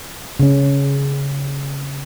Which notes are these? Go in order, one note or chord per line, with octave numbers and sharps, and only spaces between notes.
C#3 C#4